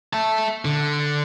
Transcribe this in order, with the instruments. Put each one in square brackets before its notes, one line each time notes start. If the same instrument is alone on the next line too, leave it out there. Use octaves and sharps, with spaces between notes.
[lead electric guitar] E5 A5
D3